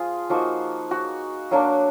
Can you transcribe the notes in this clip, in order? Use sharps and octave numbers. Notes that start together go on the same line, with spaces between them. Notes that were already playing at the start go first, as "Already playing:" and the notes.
Already playing: F3 F4 G#4
F3 A#3 D#4 F#4
F#4
F#3 A#3 D4